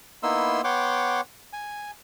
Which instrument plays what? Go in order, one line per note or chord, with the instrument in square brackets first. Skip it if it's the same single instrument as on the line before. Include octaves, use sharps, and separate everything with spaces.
[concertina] A#3 B3 D#4 E4 C6 E6
B3 C#5 F#5 G5 C6 D6
G#5